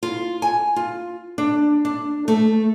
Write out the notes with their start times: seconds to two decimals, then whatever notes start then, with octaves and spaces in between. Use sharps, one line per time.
0.03 F4
0.42 G#5
0.76 F4
1.38 D4
1.85 D4
2.28 A3